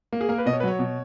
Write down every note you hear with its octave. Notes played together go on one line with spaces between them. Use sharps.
A#3
G#4
A#3 A#4
B4
B2 D#5
C#5
B4
F#3 C#5
B2